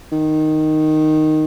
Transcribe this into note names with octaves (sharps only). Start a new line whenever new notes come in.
D#3